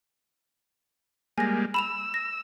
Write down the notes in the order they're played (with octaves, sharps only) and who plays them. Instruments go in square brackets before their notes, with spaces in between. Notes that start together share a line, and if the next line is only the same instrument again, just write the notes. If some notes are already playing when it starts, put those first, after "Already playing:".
[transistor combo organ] G3 G#3 A#3 [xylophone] G#5 A#6
[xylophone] B5 E7 F7 [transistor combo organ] E6
[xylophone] A#6